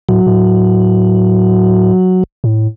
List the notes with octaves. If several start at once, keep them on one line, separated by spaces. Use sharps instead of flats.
A2 F#3
A2
A2